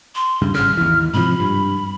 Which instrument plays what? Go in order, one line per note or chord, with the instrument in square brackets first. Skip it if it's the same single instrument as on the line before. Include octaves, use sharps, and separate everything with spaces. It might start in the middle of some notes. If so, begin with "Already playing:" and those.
[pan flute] C6
[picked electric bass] D#1 G2 C#3
[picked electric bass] G#1 C#3 [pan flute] F6
[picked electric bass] D#2 E3
[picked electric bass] G#2 C3 F3 [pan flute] B5
[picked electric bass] G2